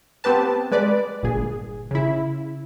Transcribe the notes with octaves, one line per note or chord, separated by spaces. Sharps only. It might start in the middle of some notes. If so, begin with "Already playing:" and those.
B3 C4 G4 B4 A5
G#3 B4 D5
G1 A#2 G#4
C#3 E4